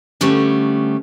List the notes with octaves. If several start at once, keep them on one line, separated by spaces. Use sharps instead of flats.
D3 G3 A3 B3 C#4